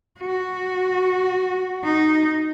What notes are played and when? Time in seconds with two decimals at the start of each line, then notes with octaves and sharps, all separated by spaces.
0.20 F#4
1.84 D#4